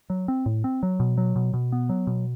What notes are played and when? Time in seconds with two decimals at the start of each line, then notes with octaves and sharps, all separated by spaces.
0.10 F#3
0.28 C4
0.46 A2
0.64 C4
0.83 F#3
1.00 B2
1.18 F#3
1.36 B2
1.54 B2
1.72 B3
1.89 F#3
2.07 B2